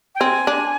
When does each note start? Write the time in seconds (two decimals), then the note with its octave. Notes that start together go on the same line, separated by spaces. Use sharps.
0.15 G5
0.20 C4 G#5
0.47 D4